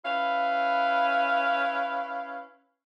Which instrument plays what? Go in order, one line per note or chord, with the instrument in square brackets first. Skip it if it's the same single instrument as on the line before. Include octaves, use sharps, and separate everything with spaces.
[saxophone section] C#4 E4 B4 F5